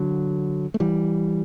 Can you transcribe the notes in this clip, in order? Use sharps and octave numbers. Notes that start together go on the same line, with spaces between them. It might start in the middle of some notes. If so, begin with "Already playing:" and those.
Already playing: D3 F#3
A3
E3 G3